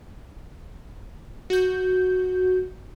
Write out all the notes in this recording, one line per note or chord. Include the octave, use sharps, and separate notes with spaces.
F#4 G6